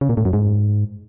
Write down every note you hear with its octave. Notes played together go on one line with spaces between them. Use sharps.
C#3
A#2
A2
F#2
G#2